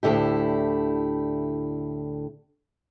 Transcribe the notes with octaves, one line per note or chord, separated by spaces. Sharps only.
D2 A2 D3 E4 G4